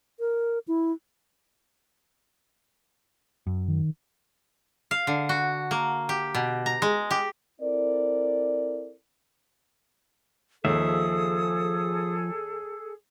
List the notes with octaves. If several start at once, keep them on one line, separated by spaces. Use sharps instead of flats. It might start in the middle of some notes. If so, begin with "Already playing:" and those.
A#4
E4
F#2
D#3
F5
D3
F#4
A#3
G4
B2
A#5
G#3
G4
C4 E4 A4 A#4 D5
D#2 F3 G#4 A4 E5 D#6